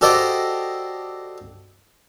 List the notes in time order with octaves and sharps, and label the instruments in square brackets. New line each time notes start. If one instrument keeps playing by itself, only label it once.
[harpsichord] F#4 G4 A4 C5 D5 D#5